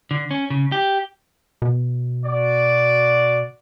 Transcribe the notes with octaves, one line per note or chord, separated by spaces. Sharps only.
D3
C#4
C#3
G4
B2
F#4 D5